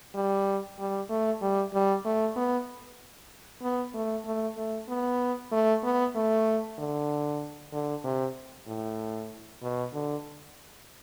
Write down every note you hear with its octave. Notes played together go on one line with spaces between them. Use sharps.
G3
G3
A3
G3
G3
A3
B3
B3
A3
A3
A3
B3
A3
B3
A3
D3
D3
C3
A2
B2
D3